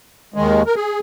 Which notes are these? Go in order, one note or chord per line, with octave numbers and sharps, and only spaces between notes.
D#2 D#3 G#3
A#4
G#4